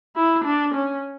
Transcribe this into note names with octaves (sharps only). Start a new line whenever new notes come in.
E4
D4
C#4